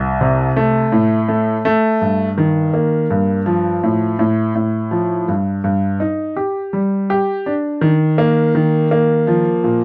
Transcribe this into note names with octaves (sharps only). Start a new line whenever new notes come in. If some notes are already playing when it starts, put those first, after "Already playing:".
Already playing: C2
C3
A3
A2
A3
A3
G2
D#3
A#3
G2
F3
A2
A2
A2
F3
G2
G2
D#4
G4
G3
G4
D4
D#3
A#3
D#3
A#3
F3
A#2